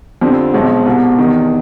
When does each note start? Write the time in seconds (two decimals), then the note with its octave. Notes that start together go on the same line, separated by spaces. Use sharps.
0.21 F2 D3 G3 C4
0.54 B1 B2 G#3 C4
0.86 C2 B2 G3
1.18 E2 C3 D#3